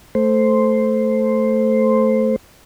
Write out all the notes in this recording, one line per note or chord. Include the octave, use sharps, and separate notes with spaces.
A3 C5